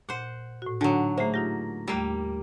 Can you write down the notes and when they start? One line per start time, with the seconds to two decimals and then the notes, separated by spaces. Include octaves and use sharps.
0.09 A#2 C5 F#5
0.62 A2 F#4
0.81 D3 F#3 D4 D#4 F#4
1.18 A3 A#3 G#4 C5 E5
1.34 D#4 F4 G4 A#6
1.88 D#2 G3 A3 A#3 E6